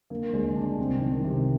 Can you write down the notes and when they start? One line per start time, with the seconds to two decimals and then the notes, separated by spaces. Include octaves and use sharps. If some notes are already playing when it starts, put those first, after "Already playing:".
0.10 D3 A#3
0.33 D2 G#3
0.56 D3 D4
0.78 C2 C4
1.01 D#3
1.24 C3